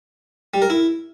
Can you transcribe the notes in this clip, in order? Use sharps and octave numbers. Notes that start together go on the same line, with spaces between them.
G3
A#4
E4